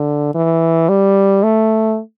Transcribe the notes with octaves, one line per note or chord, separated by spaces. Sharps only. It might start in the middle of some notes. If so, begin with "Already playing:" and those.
Already playing: D3
E3
G3
A3